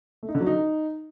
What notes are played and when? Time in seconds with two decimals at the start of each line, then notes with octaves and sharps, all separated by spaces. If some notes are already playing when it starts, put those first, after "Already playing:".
0.23 A3
0.29 D#4
0.35 D3
0.41 F#3
0.47 D#4